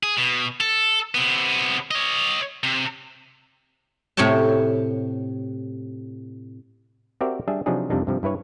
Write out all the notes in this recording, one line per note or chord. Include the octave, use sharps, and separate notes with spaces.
G#4
B2
A4
C3 B3
C#5 D#5
C3
A2 C3 C#5 G5 A5
C4 F#4 G4 A#4 D5 E5
G3 D4 G#4 E5
C3 F3 F#3 D4 D#4 G#4
F2 C3 G3 D4 D#4
G2 C3 F3
G2 E4 B4 C#5